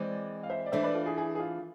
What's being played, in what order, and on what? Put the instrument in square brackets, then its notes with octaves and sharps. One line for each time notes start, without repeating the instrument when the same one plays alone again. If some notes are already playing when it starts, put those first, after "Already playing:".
Already playing: [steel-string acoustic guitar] E3 G#3 C4 [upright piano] D5
[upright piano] F5
C5 E5
D5
[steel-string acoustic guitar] E3 A3 D4 [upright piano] C5 E5
[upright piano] B4 D5
F4 A4
E4 G#4
E4 G#4
G#4
F4